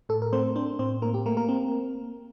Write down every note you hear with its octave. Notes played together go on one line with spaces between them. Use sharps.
A2 A4
A#4
A3 C4 C5
C4 D4 C5
A2 C4 C5
A2 A#3 A#4
G4
A3 A#3 A#4
A#3 A#4
C4